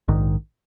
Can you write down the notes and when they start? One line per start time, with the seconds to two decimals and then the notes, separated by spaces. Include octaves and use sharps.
0.08 A#1 G#2 D#3